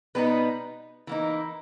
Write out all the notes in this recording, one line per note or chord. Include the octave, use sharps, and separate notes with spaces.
B2 G3 B3 D#4 B4
E3 A#3 D#4